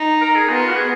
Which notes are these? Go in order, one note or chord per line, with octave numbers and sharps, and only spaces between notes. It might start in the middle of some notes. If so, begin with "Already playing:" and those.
Already playing: D#4
A#4
G#4
B3 F4
F#4
G#4